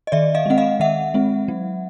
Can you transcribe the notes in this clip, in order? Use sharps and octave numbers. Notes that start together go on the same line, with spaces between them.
D#5
D#3 D5 E5
D#5 F5
G#3 C4 F#5
D#5 F5
D#3 E5 F#5
G#3 C4
F#3